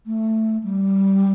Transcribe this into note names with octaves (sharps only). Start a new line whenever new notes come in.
A3
G3